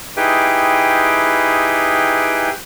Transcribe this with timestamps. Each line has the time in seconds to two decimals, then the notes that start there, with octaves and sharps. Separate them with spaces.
0.17 D#4 E4 G4 G#4 B4 G5